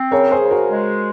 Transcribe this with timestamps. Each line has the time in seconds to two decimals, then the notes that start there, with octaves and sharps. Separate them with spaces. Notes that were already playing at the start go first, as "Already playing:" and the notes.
Already playing: C4
0.11 C#3 A#4 C#5
0.31 G#4 C5
0.42 C#3
0.51 F#4 A#4
0.69 G#3